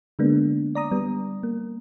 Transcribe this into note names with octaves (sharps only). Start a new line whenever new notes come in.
D3 G#3 A#3 B3 D4
D5 A#5 D#6
G3 B3
A#3